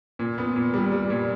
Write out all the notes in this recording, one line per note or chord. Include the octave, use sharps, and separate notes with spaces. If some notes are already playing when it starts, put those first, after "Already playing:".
A#2
B3
A#2
G3
G3
A#2